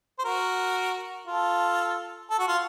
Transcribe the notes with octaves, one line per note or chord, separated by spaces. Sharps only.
C5
F#4 A#4
F4 A4
A4
F#4
F4